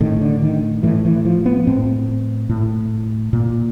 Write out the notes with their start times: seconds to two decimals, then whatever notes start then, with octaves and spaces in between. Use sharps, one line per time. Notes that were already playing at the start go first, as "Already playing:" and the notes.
0.01 A2 D#3
0.21 D3
0.42 D#3
0.83 A2 E3
1.05 E3
1.25 F3
1.46 B3
1.67 A2 C4
2.49 A2
3.33 A#2